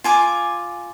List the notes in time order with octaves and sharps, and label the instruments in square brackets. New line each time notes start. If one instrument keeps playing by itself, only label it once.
[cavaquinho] F4 G#5 D6